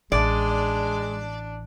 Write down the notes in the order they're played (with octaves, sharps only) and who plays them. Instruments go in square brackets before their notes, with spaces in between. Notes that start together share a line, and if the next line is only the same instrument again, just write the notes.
[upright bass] A1 [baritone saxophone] G#3 [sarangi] D4 [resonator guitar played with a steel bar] D5